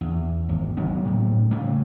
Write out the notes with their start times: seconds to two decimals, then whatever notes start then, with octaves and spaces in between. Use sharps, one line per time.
0.01 E2
0.49 G#1
0.77 F#3 B3 C#4
1.04 A2 G3
1.51 C#3 G3 A3